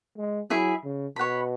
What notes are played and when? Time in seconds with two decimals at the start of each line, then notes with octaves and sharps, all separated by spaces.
0.18 G#3
0.50 F#3 E4 G#4 E5
0.84 C#3
1.16 B2 C#5 F#5 B5